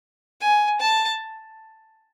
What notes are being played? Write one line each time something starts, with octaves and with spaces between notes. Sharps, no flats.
G#5
A5